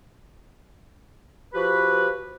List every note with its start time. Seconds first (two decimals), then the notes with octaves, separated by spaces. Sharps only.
1.54 F3 F#4 G4 B4